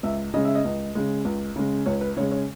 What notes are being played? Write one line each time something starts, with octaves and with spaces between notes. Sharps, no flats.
C#2 E5
C#3 G#3 D#5
E5
D#5
C#2
C#3 G#3
C#2
C#3 G#3
C#2 C#5
B4
C#3 G#3 C#5
C#5